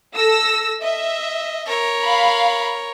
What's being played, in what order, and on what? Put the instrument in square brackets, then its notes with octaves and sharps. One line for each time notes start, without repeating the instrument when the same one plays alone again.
[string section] A4 E6 A#6
[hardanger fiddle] D#5 [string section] E5
[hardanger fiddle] A#4 C#5
[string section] F5 B5